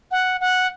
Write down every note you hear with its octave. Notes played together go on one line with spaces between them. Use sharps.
F#5
F#5